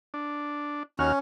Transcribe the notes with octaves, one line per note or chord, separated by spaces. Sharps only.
D4
D#2 C#4 F#4 F6